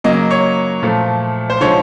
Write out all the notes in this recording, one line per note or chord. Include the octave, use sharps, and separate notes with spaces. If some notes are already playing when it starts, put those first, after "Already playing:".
C#3 F#3 A#3 D#5
C#5
A#2 F3 A3
C5
D3 F3 G#3 C#5